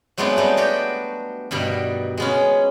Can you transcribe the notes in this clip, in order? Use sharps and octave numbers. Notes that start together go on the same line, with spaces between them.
F#3 G#3 A3 B3 C4 D4
G3 B3 D#4
D4 F#4 G4 G5
G2 B2 D#3 G3
G#3 B3 C#4